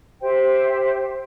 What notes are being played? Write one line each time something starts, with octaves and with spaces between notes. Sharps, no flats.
G4 C5 E5 G5